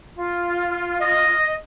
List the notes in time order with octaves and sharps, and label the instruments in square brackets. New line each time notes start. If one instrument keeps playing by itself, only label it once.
[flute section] F4
[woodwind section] D#5